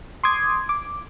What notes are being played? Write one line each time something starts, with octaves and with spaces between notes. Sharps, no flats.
C6 D6 D#6 G#6
D6